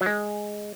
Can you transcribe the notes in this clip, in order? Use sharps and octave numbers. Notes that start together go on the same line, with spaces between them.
F#3
G#3